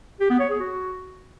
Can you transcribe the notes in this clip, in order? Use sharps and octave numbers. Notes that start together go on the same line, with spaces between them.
G4
B3
C#5
G#4
F#4